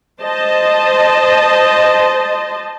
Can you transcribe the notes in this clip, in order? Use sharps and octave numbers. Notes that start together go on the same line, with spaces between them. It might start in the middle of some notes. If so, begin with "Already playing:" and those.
C5 D#5 A5